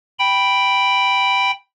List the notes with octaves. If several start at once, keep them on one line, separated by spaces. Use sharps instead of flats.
G5 B5